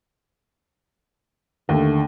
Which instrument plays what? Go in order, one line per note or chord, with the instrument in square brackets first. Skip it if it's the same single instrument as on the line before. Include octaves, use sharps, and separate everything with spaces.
[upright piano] D#2 A3 [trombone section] D3